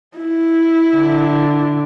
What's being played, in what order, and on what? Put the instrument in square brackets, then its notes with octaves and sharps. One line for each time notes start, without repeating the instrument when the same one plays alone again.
[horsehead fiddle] E4
[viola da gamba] D3